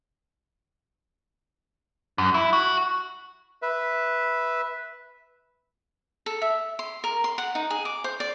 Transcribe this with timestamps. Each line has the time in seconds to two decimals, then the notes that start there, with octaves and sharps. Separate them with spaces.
2.18 F#2
2.34 E4
2.53 F#4
3.62 B4 E5
6.26 A4
6.42 E5
6.79 C6
7.04 A#4
7.24 C6
7.38 F#5
7.55 D#4
7.70 G#4
7.85 D6
8.04 C5
8.20 D5